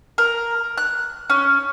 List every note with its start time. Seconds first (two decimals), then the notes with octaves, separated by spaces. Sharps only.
0.18 A#4
0.77 F#6
1.30 C#4